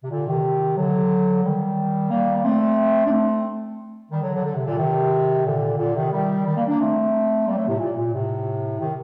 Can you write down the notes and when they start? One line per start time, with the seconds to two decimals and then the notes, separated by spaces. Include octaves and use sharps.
0.03 C3
0.10 A#2 D3
0.27 C3 D#3
0.77 D3 F#3
1.43 D#3 G3
2.10 G3 A#3
2.37 A#3
2.44 A3 C4
3.06 D4
3.11 A3 C4
4.12 D#3 G3
4.23 D3 F#3
4.33 D3 F#3
4.44 D3
4.56 C3
4.67 A#2 D3
4.78 C3 D#3
5.46 A#2 D3
5.78 A#2 D3
5.95 C3 D#3
6.12 D#3 G3
6.45 D#3 G3
6.57 G3 A#3
6.67 A#3 D4
6.79 A3 C4
7.46 G3 A#3
7.57 F#3 A3
7.68 A2 C3
7.79 A#2
7.96 A#2
8.13 A2 C3
8.79 C3 D#3